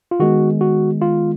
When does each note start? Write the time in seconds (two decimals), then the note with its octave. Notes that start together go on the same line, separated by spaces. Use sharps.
0.11 F4
0.20 D#3 G#3 B3 F#4
0.61 F#4
1.02 F4